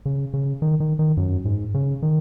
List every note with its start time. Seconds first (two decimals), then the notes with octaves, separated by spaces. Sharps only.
0.05 C#3
0.34 C#3
0.62 D#3
0.80 D#3
0.99 D#3
1.17 F#2
1.45 G#2
1.74 C#3
2.02 D#3